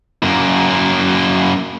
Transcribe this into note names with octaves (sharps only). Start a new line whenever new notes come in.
F#2 A#3